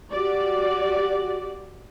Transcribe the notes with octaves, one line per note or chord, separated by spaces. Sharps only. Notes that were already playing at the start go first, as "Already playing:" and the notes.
F#4 G4 D5